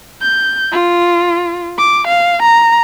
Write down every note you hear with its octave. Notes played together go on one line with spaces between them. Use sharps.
G6
F4
D6
F5
A#5